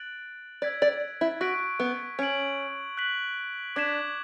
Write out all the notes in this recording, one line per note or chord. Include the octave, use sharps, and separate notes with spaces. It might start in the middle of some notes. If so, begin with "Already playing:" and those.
Already playing: F#6 A6 D7 F#7
D5 E6 G#6 B6 D7
D5
E4
F#4 C#6 F#6 B6 D7
B3
C#4 G#6 D7 F#7
F#6 B6 F#7
D4 D6 G#6 B6 E7